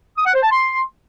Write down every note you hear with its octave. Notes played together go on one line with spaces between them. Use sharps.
D#6
F#5
C5
A5
C6